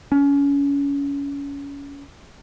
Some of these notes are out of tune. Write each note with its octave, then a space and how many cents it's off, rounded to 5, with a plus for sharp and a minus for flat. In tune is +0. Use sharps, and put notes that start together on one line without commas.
C#4 +30